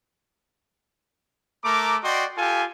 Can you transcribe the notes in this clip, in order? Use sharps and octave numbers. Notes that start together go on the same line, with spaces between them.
A3 A#4 A#5 D6
F#4 D5 D#5 G5 C6
F4 G4 A4 F5 G#5